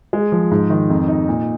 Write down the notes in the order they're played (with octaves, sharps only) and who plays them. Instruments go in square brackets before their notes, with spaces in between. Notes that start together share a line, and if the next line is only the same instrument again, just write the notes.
[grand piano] G#3
F3
G#2
D#3
F2
D#4
A#2